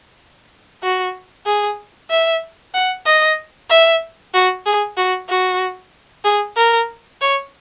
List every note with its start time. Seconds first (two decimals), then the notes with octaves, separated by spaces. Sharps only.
0.83 F#4
1.47 G#4
2.11 E5
2.74 F#5
3.06 D#5
3.70 E5
4.34 F#4
4.66 G#4
4.98 F#4
5.30 F#4
6.25 G#4
6.57 A#4
7.21 C#5